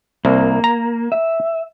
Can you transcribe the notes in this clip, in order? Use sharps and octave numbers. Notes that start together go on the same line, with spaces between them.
C2 A#3
A#5
E5